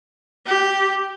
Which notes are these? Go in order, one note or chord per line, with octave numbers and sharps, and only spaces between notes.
G4